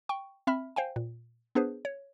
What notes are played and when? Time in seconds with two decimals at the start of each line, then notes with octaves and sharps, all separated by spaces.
0.09 G5 C#6
0.47 C4 E5 B5 F6
0.76 C5 F5 G5 G#5
0.96 A#2
1.55 B3 D4 G#4 B4 C5
1.85 C#5